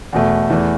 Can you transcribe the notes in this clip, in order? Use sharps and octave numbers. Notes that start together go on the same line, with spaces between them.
E2 B2 A3
E2 E3 A3